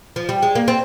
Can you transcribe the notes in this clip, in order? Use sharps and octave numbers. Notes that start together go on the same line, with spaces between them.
F3
G3
G#3
A#3
C4